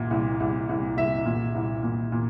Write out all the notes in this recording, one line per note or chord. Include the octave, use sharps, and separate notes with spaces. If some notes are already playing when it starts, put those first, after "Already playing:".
Already playing: C2 A#2
C2
C2
C2
C2 E5
A#2
C2
A#2
A#2